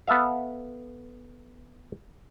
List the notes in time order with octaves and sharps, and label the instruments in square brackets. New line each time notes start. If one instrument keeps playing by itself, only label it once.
[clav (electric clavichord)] B3 A4 E5 F5